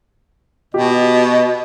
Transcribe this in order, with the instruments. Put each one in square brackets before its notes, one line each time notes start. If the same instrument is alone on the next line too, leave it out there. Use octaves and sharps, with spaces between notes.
[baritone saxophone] B2 [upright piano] G4 [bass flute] D#5